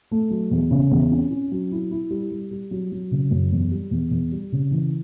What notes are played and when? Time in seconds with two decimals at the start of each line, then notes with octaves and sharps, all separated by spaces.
0.11 A3
0.30 F#3
0.51 E2
0.71 C#3
0.91 E2
1.11 C#4
1.31 C#4
1.52 F#3
1.72 E4
1.91 E4
2.11 G3
2.31 G3
2.51 G3
2.71 F#3
2.92 F#3
3.11 C#3
3.31 F#2
3.51 E2
3.71 G3
3.91 E2
4.11 E2
4.32 G3
4.52 C#3
4.71 E3